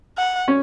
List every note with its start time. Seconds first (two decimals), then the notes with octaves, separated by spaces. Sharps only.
0.18 F#5
0.48 C#4